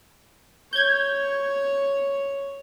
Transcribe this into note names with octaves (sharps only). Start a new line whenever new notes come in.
C#5 G6 G#6